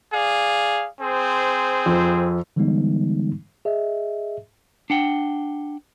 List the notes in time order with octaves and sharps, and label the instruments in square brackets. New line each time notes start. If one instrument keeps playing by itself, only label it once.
[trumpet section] G#4 D5 F5
C4 G#4 C5
[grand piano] F2
[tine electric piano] D3 E3 G3 G#3 B3 D#4
G#4 D#5 E5
[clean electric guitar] D4 F#5 G5